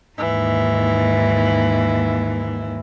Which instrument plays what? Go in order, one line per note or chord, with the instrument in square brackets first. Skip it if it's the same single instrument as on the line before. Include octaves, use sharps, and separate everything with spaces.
[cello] D#2 G#2 [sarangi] E3